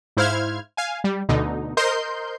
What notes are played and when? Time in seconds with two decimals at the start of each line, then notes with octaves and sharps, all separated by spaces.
0.17 G#2 E4 C5 F5 F6 G#6
0.77 F5 G#5
1.04 G3
1.29 D2 B2 D3 D#4
1.77 A#4 C5 D#5 C6 G6